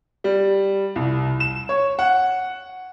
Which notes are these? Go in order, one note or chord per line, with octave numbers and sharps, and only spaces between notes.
G3
C2
E7
C#5
F#5